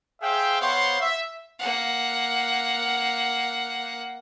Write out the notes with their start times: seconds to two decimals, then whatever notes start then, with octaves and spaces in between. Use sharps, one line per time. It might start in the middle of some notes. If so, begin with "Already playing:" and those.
0.22 G#4 C5 E5 F5 G5
0.61 B3 C5 C#5 F5 F#5 C6
1.01 E5
1.59 A#3 F#5